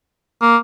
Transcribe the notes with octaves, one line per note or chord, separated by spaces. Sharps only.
A#3